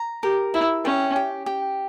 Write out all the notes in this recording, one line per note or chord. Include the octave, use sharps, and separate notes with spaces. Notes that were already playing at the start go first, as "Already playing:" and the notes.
Already playing: A#5
G4 A#4
E4 E5
C#4 G5
G4
G4